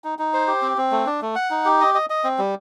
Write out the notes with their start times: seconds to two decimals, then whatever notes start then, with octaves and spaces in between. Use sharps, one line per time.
0.04 D#4
0.19 D#4
0.33 C5
0.47 G4
0.62 C4
0.77 C4
0.91 A3
1.06 D4
1.22 A3
1.35 F#5
1.50 D#4
1.65 G4
1.81 D#5
1.94 D#5
2.10 D#5
2.24 C4
2.38 G3